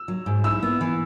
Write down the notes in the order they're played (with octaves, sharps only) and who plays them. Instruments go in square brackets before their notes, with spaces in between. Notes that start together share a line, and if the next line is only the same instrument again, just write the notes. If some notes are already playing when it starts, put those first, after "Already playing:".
Already playing: [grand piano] E6
[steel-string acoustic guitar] F#3
G#2
[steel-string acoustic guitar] E4 [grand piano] E6
[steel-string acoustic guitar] B3
E3